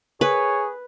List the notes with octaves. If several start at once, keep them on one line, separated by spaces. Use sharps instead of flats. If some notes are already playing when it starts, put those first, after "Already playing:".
G#4 B4 C#5